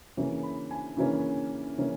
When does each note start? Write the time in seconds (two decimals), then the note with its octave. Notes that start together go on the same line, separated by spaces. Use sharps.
0.17 C#3 E3 A#3 C#4
0.43 B5
0.71 G#5
0.97 C#3 E3 A#3 C#4
1.78 C#3 E3 A#3 C#4